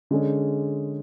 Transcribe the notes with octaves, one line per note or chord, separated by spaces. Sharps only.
D3 G#3 C#4 G#4